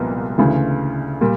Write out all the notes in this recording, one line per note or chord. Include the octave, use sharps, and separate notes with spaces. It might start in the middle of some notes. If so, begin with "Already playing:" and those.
Already playing: C2 A#2 F3 G#3 B3
D2 C#3 E3
A#2 G3